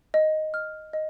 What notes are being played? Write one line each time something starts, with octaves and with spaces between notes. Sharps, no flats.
D#5
F6
D#5